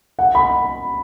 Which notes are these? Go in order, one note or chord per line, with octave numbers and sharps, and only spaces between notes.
F#5
B5